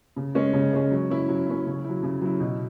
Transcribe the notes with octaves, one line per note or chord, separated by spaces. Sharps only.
C#3
G#3 C#4
C#3
G#3 C#4
F#3
C#4 E4
F#3
C#4 E4
C#3
F#3 E4
C#3
F#3 E4
B2